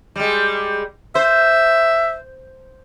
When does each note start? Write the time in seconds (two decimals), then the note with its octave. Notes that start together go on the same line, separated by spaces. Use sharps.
0.16 G3 G#3
1.15 C5 E5